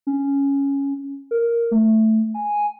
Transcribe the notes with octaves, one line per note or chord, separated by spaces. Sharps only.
C#4
A#4
A3
G#5